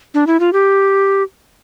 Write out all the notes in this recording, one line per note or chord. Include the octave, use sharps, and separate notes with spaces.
D4
E4
F4
G4